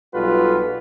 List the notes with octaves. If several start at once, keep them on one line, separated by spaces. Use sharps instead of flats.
B1 G3 F4 F#4 A4 B4